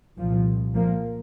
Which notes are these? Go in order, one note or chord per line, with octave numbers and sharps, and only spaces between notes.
C2 A#2 F3
F3 A#3